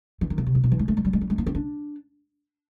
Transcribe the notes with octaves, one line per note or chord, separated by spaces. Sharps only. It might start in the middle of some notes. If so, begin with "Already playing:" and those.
E3
D#3
C#3
C3
A#2
B2
E3
G#3
A3
G#3
G3
G#3
G3
G#3
A#3
C4
D4